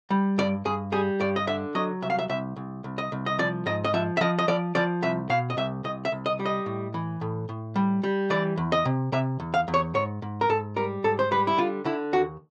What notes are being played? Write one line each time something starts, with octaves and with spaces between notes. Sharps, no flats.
G3
G2 D5
G2 G#4
G3 G#4
G2 D5
D#5
D3 E5
F#3 D#5
C2 E5
F5
E5
C2 E5
C2
C2
D#5
C2
D#5
F3 D5
G#2 D#5
D#5
F3 E5
E5
F3 D#5
D#5
F3 D5
F3 D5
C2 E5
B2 F5
D#5
C2 E5
C2 D#5
E5
C2
D#5
G3
D#5
A2
E3
A2
A2
G3
G3
E3 D5
E2
D#5
C3
C3 E5
E2
F5
E2
C#5
G#2 C#5
G#2
A#4
G#2 A4
G3 A#4
G#2 A4
C5
G3 B4
E4
D3 F4
D3 E4
D#2 F#4